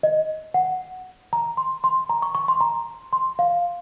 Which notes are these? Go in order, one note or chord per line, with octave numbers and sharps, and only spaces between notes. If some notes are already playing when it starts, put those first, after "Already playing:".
D#5
F#5
A#5
C6
C6
A#5
C#6
C#6
C6
A#5
C6
F5